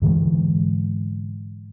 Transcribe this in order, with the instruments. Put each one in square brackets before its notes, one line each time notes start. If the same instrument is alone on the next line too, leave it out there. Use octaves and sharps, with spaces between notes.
[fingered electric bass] G#2 D3 E3 G#3